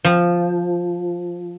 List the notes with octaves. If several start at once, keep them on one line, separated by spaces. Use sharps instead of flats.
F3